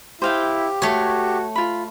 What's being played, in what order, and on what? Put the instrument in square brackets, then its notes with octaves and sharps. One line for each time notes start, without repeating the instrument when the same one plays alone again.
[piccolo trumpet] E4 [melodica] G4 [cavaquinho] C5 F5 G5
[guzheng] A3 C#5 [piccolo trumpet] F#4
[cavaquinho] F4 B5